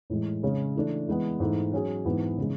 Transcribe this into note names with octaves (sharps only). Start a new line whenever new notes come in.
A2 E3 G#3
C#3 G#3 C#4 G#4
E3 A3 D4
E3 G#3 B3
G#2 E3 A3
F#3 C#4 G#4
G#2 E3 B3
C#3 E3 G#3